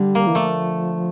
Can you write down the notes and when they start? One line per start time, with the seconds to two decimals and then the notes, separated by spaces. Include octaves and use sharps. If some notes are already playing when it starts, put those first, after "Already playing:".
Already playing: D3 G3
0.15 A#3
0.27 E3
0.35 F3 A3